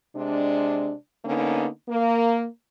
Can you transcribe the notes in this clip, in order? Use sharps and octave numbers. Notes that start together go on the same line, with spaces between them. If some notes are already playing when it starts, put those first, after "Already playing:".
C3 G#3 D4
D3 A#3 B3 C#4 D#4
A#3